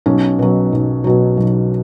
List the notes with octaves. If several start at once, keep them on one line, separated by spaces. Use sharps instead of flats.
B1 C#4
B2 F#3
B1
B2 F#3
B1